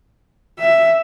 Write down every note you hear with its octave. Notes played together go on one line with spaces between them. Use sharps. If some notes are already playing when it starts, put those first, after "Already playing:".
E5